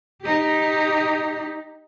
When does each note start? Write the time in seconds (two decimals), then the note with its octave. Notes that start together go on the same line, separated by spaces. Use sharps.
0.22 D#4 G4